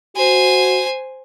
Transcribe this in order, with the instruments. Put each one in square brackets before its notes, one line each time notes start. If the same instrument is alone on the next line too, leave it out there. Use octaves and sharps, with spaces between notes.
[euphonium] F#4 [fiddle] C5 G#5